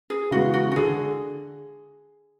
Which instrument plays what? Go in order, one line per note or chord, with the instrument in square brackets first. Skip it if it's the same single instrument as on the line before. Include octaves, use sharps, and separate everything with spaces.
[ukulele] G#4
[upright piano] C#3 E3 G#3 B3 [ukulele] F#4
[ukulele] F#4
F#4
[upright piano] D3 [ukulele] G#4